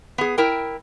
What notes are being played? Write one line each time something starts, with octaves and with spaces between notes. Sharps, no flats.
B3 G#4
E4 A#4 G5